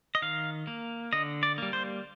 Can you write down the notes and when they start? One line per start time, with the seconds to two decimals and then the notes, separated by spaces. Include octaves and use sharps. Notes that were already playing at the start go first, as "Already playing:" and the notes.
0.15 D#5
0.22 D#3 F5
0.67 A#3
1.13 D3 D#5
1.43 D5
1.58 G3 A#3
1.73 C5